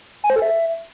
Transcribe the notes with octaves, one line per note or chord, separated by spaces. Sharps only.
G#5
C5
A4
E5